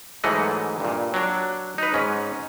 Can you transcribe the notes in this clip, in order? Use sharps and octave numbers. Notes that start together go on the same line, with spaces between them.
G#2 E3 F#3 A3 D#5 F#5
G2 A#2
F#3 D4
D#4 B4
G#2 C#4